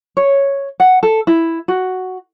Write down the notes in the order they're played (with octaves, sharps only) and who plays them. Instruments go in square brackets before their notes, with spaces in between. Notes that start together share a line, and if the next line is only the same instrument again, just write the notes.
[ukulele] C#5
F#5
A4
E4
F#4